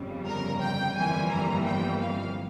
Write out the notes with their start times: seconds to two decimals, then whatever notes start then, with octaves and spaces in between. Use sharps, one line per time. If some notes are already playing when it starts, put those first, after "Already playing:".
Already playing: G1 F2 C#3 G3
0.26 A#4
0.61 G5
0.94 G1 F2 E3 G3 A#3 G#5
1.30 A#5
1.64 G5
1.99 F5